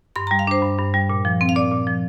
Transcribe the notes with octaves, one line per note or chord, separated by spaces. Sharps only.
G2 C6
A#5
G3
F5
D4 C5
G2
G2
G3
A#2
F3
C4
F5
A#2 D5
A#2
F3